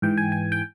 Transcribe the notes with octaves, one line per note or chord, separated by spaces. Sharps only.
G#2 E3 G5
G#5
G#5
G5